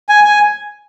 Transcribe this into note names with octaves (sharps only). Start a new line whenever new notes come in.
G#5
G#5